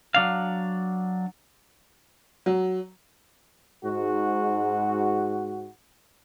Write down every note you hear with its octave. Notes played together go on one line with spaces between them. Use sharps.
F#3 D4 F5
F#3
G#2 F#4